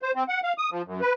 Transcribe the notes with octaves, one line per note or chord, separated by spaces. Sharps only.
C5
C4
F#5
F5
D#6
F3
F#2
B4